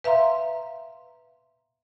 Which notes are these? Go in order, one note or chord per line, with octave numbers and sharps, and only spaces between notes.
B4 E5 F5 A#5 C6